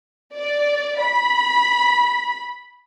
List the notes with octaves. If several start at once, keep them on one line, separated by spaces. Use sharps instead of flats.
D5
B5